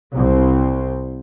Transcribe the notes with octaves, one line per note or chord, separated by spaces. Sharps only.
C2 C4